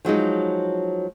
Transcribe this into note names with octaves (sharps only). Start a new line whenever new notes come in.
F3 F#3 G#3 D#4